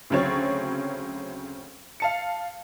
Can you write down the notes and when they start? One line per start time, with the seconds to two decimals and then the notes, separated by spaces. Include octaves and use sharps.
0.10 D2 C#3 F#3 C4 C#5 A6
2.00 F5 A5 C#7